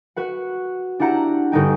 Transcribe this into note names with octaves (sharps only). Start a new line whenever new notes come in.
F#4 B4 F#5
D4 E4 G4 F#5 A#5
G1 C#4 D#4 G5